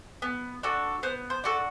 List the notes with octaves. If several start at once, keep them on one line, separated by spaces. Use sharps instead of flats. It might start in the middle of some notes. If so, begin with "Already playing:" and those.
B3
D4 F#4 A4
B3 C5
C5
D4 F#4 A4